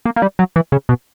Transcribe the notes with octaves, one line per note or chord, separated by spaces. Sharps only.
A#3
A#3
G3
F#3
E3
C#3
B2